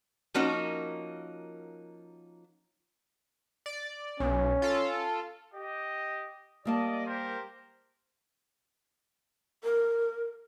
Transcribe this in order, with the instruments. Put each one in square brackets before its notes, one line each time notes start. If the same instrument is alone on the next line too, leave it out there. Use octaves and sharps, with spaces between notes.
[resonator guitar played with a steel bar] F3 A#3 C#4 D#4 F#4 A#4
[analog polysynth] D5
[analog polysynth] B1 [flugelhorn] C#4
[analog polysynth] F4 A4
[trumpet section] G4 D#5
[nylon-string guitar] G3 A#3 A5 [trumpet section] D5 D#5
[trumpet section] G4 A#4 C5
[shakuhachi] A#4